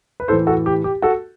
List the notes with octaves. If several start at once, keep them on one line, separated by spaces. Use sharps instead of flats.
B4
A2 E3 A4 C5
F#4 A4
G4
G4
F#4 A4